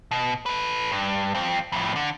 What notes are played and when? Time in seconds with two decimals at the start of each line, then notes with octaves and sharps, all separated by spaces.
0.11 B2
0.46 A4 B4
0.92 G2
1.35 F2 C4
1.72 F2 A2
1.96 D3